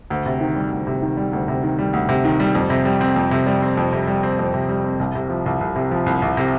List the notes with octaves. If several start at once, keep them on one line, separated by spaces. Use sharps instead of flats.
D2
C3
D#3
G3
D2
C3
D#3
G3
D2
C3
D#3
G3
D2
C3
D#3
G3
F2
C3
G3
C4
F2
C3
G3
C4
F2
C3
G3
C4
F2
C3
G3
C4
C2
C3
F3
C2
C2
C3
F3
C2
C2
C3